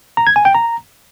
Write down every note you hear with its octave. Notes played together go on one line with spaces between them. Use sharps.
A#5
G#6
G#5
G5
A#5